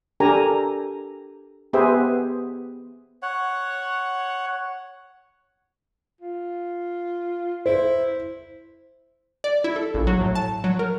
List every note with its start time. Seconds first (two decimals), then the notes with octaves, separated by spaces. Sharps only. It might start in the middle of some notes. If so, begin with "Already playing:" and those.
0.20 D4 G4 A4 A#4 G#5 A#5
1.73 B3 G4 G#4 B4 C5 E5
3.22 C#5 F#5
6.21 F4
7.66 E4 C5
9.44 D5
9.64 E4
9.76 A4
9.94 A#1
10.07 F#3
10.21 A2
10.35 A5
10.64 F#3
10.79 A#4